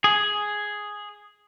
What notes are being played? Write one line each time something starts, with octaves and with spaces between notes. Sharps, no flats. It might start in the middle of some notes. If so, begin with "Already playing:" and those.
G#4